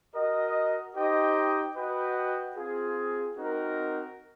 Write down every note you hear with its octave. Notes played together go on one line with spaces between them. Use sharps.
F#4 A#4 D#5
D#4 G4 C5 D#5 G5
F#4 B4 D#5 G5
C4 F4 G#4
C4 D#4 F#4 A#4